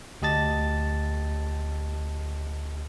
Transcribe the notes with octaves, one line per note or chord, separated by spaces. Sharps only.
D2 G4 D#5 A5 A6